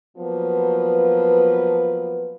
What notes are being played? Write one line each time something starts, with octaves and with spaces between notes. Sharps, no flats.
F3 F#3 A#3 B3 B4